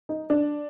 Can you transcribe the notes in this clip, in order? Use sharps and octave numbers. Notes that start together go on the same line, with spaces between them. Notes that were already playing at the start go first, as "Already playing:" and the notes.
D#4
D4